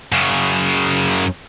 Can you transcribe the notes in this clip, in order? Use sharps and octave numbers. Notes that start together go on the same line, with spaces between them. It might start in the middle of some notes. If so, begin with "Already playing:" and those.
F#2 C#3